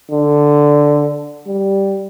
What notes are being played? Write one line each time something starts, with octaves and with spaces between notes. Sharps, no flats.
D3
G3